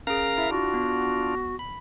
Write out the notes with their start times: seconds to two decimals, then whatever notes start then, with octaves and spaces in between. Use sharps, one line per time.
0.07 C#4 G#4 A#4 F5 A#5
0.38 E4 E5
0.51 D4 F4 F#4
0.74 B3
1.59 B5